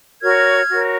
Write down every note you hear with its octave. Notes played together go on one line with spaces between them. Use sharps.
F#4 A#4 C#5 F6 G#6
F#4 A#4 C#5